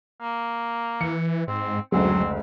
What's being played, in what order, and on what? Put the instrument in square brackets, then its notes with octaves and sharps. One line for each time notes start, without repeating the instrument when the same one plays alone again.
[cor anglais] A#3
[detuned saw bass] E3 [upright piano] C#7
[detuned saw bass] G#2 [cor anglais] C4
[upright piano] F#1 D2 G#3 [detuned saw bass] F#3 [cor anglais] C4